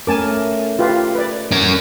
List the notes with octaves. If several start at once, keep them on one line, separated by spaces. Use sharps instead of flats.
A3 C#4 A#4 G#5 A5 D6
F4 G4 B4
B4 D5
C#4 A#4